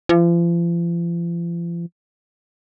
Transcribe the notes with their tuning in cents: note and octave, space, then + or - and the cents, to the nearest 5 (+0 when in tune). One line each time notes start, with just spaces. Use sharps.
F3 -40